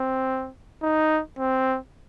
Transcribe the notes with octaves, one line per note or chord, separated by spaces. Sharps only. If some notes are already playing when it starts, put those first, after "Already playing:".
Already playing: C4
D#4
C4